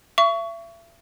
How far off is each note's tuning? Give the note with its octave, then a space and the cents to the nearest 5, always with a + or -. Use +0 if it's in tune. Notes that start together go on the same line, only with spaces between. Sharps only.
E5 +35 C#6 +25